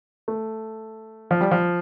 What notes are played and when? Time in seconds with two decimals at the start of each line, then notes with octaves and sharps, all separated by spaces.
0.28 A3
1.31 F3
1.41 G3
1.51 F3